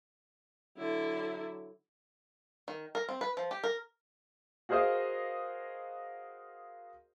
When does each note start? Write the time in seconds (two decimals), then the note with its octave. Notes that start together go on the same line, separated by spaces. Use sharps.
0.78 D3 F#3 E4
2.68 D#3
2.95 A#4
3.09 C4
3.21 B4
3.37 F3
3.51 G4
3.64 A#4
4.69 F#4 G#4 A#4 C5 D#5 F5